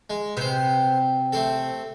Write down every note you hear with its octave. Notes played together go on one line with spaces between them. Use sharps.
G#3
C3 B3 C5
A3 C4 A4